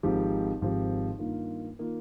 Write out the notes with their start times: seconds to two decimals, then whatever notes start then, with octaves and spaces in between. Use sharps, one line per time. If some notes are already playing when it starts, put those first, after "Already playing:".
0.03 G#1 G#2 F3 C4 G4
0.61 G#1 G#2 F3 C4 G4
1.19 G2 D#3 A#3 F4
1.79 D#3 A#3 F4